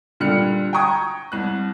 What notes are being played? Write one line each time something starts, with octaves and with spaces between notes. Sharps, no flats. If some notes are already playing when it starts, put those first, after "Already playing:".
A#2 D3 G3 F6 F#6 C#7
G5 A5 A#5 C#6 D#6 G#6
C2 F#6